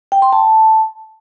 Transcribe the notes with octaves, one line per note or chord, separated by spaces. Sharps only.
G5
C6
A5